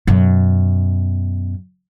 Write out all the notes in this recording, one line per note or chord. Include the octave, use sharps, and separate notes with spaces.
F#2 B2